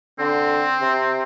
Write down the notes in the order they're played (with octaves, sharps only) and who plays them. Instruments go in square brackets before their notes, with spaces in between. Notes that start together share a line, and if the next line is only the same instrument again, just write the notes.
[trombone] D3 [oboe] C4
[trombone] C3